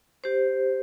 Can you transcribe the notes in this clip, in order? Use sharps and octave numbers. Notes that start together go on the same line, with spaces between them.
G4 C5